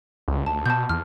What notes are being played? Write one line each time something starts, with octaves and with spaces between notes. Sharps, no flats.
C#2
D2 A5
B2 A5 G6
E2 F6